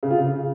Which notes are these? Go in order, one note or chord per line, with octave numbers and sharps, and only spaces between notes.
C#3
F4
C#3